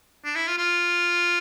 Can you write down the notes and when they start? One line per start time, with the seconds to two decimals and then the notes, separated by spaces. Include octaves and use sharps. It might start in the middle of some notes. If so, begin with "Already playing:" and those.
0.25 D4
0.36 E4
0.48 F4
0.58 F4